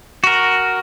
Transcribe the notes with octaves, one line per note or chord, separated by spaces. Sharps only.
F#4 A#4